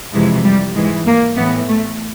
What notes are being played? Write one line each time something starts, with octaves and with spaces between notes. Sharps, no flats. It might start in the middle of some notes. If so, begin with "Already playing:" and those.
F2 C3 E3 G#3
G3
G#2 E3 G#3
A#3
A2 E3 B3
A3